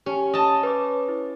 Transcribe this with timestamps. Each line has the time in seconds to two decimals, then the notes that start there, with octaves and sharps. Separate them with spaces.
0.06 C#4 G4
0.33 D#5 A5
0.63 B4 C#5 D6
1.08 E4